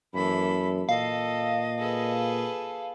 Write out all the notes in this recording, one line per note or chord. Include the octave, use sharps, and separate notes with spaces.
F#2 E3 A#3 A4 B5
A#2 A4 D#5 F5
G#4 A4 B4